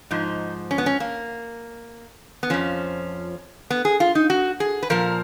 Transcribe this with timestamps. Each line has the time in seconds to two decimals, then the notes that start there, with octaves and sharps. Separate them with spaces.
0.11 G#2 F3 D#4
0.71 C#4
0.78 B3
0.86 C#4
1.00 A#3
2.43 B3
2.50 F2 F3 C#4
3.70 B3
3.85 G#4
4.00 F4
4.15 D#4
4.30 F#4
4.60 G#4
4.83 B4
4.90 A#2 F3 A#4